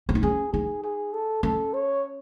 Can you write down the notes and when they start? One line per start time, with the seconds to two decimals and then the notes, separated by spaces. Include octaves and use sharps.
0.09 C#4
0.15 D#4
0.23 C#4 G#4
0.53 D#4 G#4
0.84 G#4
1.13 A4
1.43 C#4 A4
1.74 C#5